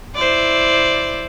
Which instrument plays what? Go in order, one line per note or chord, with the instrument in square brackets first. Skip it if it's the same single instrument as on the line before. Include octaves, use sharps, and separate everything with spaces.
[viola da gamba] E4 C5 D5